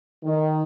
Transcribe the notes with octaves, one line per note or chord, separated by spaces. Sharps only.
D#3